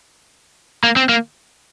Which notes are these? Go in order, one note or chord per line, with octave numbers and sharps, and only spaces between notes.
A#3
C4
A#3